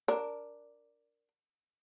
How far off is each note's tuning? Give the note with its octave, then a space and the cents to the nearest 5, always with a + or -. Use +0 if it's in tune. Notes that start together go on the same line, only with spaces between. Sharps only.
D4 +0 A#4 +0 D5 +0